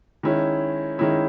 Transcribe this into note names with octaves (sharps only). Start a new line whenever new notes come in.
D#3 G#3 C#4 E4
D#3 G#3 C#4 E4